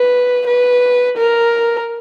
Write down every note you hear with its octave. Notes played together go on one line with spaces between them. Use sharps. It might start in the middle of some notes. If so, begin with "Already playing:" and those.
Already playing: B4
B4
A#4